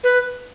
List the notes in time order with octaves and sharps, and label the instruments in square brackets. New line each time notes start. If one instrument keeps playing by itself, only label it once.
[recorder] B4